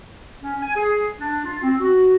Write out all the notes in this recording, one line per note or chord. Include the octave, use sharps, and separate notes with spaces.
C#4
G#5
G#4
D4
F4
C4
F#4